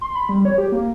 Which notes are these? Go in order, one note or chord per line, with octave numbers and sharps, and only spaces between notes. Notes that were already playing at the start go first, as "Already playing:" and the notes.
C6
B5
G3
C#5
G4
A#3